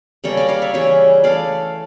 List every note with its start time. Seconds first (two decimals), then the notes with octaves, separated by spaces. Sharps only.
0.24 C#3 G3 A#3 A4 C#5
0.37 A#4 D5
0.49 D5 F5
0.62 C#5 E5
0.74 C#3 E3 G3 C#5 E5
1.24 E3 A3 D5 F5